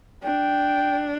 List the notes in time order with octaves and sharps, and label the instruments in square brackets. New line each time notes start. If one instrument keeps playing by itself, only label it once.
[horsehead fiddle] D4 [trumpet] G5